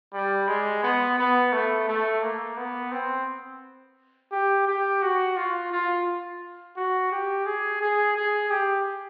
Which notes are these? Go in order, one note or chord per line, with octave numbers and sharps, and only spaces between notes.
G3
G#3
B3
B3
A3
A3
A#3
B3
C4
G4
G4
F#4
F4
F4
F#4
G4
G#4
G#4
G#4
G4